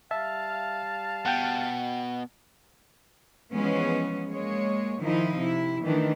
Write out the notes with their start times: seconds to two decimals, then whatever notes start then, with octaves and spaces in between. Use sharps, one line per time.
0.11 G3 E5 F5 A5
1.26 B2 F#5 G5
3.52 E3 F3 G#3 B3 C#4
4.28 G#3 A#3 C#5
4.99 D#3 F3 D#4 E4
5.37 C3 E4
5.84 D#3 E3 A3 D4